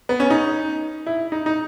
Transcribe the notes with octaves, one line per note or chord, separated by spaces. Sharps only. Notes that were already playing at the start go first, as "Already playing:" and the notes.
B3
C#4
D#4
E4
D#4
D#4